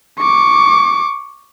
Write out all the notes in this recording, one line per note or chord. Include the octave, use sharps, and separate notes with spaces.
C#6 D6